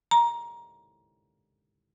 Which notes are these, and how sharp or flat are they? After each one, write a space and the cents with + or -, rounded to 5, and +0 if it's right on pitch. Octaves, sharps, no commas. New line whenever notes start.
A#5 +20